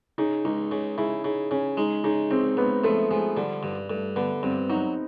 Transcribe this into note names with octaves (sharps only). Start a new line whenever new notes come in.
C#3 D#4
C#2 D#4
C#3
C#3 E4
C#3 D#4
C#3 C#4
G#3 D#4
C#3 D#4
C#2 C4
C#2 B3
F3 A3
F3 G#3
D3 G3
G2 G3
G2 A3
D3 B3
G2 C4
F#3 D#4